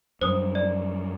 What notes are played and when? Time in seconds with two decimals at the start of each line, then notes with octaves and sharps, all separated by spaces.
0.21 F#2 G3 C5 D#6
0.55 D5